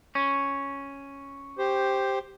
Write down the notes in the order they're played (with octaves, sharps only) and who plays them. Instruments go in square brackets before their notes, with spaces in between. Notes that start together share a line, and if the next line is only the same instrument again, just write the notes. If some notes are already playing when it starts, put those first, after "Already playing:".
[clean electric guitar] C#4
[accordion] G4 C5